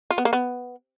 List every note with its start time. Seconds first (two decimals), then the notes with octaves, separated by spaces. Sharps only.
0.10 F4
0.18 B3
0.25 A#3
0.33 B3